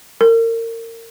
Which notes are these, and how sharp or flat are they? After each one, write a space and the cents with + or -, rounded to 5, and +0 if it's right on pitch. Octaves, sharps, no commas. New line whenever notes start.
A#4 -30